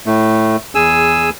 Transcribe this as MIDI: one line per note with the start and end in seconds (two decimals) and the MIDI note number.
0.06 0.56 45
0.06 0.56 57
0.75 1.30 40
0.75 1.30 68
0.75 1.30 80
0.75 1.30 88